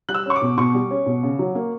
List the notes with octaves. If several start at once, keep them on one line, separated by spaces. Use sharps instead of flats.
G3 F#6
E6
C#4 C#6
D6
B2
B2 C#6
G3
C#4
B2
C#3
F#3
A#3